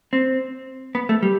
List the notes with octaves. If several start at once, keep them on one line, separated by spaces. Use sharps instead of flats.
C4
B3
A3
G3